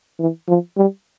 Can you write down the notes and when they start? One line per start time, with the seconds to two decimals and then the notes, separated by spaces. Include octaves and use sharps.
0.20 E3
0.48 F3
0.77 G3